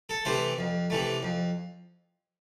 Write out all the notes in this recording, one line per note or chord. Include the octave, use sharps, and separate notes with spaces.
A4
C3 E3 A3 C5
F2
C3 E3 A3
F2